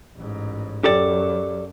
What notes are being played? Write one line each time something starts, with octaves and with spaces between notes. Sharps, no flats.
A1 G#2
F#2 G4 A4 D5